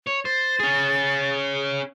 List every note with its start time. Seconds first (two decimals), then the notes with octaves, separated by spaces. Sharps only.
0.07 C#5
0.25 C5 A6
0.60 C#4 G#4